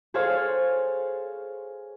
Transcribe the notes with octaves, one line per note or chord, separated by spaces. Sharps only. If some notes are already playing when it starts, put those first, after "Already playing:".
G#4 A4 C5 C#5 F5 G#5